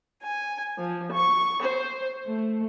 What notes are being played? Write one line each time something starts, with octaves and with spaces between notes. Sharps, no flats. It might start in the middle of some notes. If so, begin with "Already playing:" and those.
G#5
F3
C#6
C5
A3